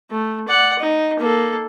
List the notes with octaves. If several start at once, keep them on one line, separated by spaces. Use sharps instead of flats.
A3
D5 F#5
D#4
A#3 A4